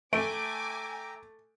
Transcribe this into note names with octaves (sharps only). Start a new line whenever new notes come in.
A3 E5 G5 G#5 A#5 D6 D7